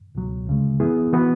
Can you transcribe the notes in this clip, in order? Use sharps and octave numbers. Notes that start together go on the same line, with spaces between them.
C#2 B2 F#3
D2 C#3 G#3
F#2 E3 B3 E4 G#4
E3 B3 F#4 B4